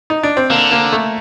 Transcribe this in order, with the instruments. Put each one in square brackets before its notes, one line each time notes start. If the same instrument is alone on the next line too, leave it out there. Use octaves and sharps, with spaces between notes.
[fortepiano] D#4
D4
C4
[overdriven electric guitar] D3 [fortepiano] A#3
[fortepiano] A#3
A3